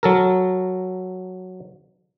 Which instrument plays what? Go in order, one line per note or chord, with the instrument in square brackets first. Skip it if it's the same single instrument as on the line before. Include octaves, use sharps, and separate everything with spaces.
[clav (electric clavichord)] F#3 A4 A#4